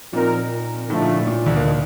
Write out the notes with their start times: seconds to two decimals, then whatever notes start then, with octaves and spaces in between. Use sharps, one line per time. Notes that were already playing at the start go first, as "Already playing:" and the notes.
0.13 A#2 F3 C4 D#4 A#4
0.89 A2 D3 F3 A3 D#4
1.02 A#2
1.15 A2
1.27 A#2
1.46 D2 D3
1.56 A#2 A#3
1.65 D#3 D#4